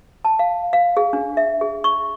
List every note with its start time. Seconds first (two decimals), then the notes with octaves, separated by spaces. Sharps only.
0.25 A5
0.39 F5
0.73 F5
0.97 G#4
1.13 D4
1.37 E5
1.61 G#4
1.84 C#6